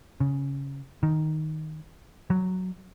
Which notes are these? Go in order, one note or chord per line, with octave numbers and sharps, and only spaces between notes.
C#3
D#3
F#3